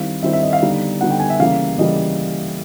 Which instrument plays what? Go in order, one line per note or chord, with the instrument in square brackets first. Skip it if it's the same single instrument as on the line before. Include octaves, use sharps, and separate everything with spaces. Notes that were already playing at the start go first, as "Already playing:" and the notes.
Already playing: [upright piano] D#3 G3 C4 E4 F5
D#3 G3 C4 E4 E5
E5
D#5
F5
D3 G3 B3 D#4
D3 G3 B3 D#4 F#5
G5
G#5
E5
C#3 E3 G3 A#3 F5
C#3 E3 G3 A#3 D#5